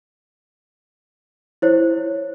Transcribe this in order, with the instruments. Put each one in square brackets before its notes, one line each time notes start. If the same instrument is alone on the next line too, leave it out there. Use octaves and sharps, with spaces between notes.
[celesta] E4 C5 C#5